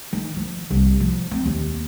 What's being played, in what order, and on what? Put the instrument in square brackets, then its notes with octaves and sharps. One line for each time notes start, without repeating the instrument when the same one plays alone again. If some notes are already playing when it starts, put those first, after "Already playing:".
[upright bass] D#3
F3
C2
F3
C4
D#2